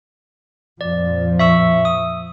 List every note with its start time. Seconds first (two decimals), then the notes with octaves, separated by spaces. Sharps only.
0.81 F2 A#2 F3 D5
1.39 E5 C#6 E6
1.85 D#6